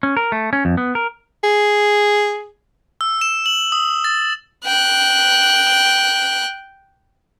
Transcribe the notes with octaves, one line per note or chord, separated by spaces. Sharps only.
C#4
A#4
A3
C#4
F2
B3
A#4
G#4
E6
E7
F#7
D#6
A6
G5 F#6